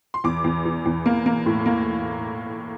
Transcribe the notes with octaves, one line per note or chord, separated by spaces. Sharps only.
C6
E2 D6
E2
E3
E2
A#3
A#3
A2
A#3